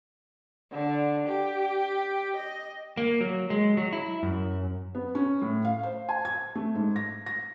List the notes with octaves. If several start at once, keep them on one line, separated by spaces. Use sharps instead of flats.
D3
G4
D#5
A#3
F#3
G#3
F#3
E4
F#2
B3
C#4
A2
F5
C5
G#5
G#6
A3
G#2
A#6
A#6